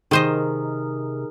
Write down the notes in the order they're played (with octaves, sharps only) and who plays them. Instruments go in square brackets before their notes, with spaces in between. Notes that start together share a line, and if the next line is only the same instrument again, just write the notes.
[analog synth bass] C3 [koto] D#3 C5 D#5 [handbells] D#4 G#4 A#4